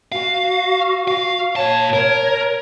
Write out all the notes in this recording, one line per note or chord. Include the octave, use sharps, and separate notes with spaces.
F#4 F5
F5
A#2 C#5 A5
A#4